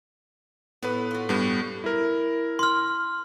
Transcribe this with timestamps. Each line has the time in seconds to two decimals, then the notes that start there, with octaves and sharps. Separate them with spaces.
0.83 A2 B3 B4 F#5
1.11 F4 F#4
1.29 G2 G3 B3 D5
1.84 E4 A#4
2.59 C6 F6